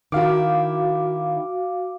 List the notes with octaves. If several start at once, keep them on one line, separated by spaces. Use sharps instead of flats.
D#3 E4 F#4 F5 D6